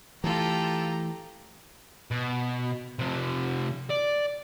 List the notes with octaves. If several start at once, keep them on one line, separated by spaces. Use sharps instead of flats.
E3 A3 F4 G4 A4 A#5
B2
C3 F3
D5